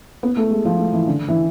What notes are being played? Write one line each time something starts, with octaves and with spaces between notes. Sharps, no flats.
B3
A3
G#3
F3
A3
E3
D3
E3